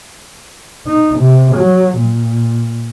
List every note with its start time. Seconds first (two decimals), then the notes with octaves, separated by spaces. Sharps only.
0.87 D#4
1.19 C3
1.56 F#3
1.98 A#2